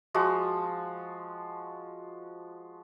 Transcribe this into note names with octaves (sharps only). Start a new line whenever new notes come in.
F3 G#3 F#4